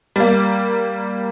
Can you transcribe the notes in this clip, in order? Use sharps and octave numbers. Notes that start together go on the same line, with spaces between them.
G3 A#3